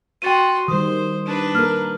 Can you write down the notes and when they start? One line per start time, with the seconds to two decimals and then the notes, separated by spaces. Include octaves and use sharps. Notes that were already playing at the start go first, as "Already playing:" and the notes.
0.22 F#4 G5 C6 A6 D#7
0.68 D#3 G3 C5 D#6
1.26 D4 B4
1.55 A#3 A#4 F6